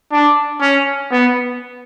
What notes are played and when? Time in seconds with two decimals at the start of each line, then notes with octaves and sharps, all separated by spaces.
0.12 D4
0.61 C#4
1.11 B3